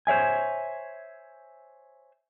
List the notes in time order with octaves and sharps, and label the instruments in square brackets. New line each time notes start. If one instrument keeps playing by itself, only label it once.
[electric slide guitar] C5 C#5 E5 G#5